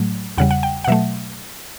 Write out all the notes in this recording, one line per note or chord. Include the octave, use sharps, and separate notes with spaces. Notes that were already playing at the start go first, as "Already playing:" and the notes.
Already playing: A2 F#3 A3
E2 C#3 G3 F#5
F#5
G5
F#5
B2 F#3 A3 E5